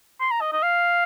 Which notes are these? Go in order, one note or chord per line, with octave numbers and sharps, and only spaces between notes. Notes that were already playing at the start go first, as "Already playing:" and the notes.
C6
A#5
D#5
D#5
F5